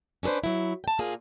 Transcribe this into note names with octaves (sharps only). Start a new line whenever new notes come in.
C#4 D4 A4 B4 C5
F#3 E4
G5 A5
A#2 A#3 F4 G#4